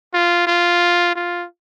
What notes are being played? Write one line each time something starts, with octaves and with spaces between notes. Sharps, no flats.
F4
F4
F4